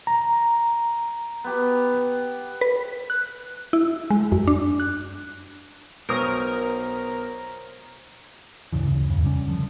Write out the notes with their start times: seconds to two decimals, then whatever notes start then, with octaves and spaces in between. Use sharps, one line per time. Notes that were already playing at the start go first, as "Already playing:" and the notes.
0.07 A#5
1.44 B3 G4
2.61 B4
3.10 F#6
3.73 E4
4.10 G#3
4.32 F#2
4.47 D4
4.80 F#6
6.09 B1 A#4 C5 C#5 C#6 D#6
8.73 D2 G2 C#3 E3
9.10 E2 C#3
9.24 G3 C#4
9.48 D3 F3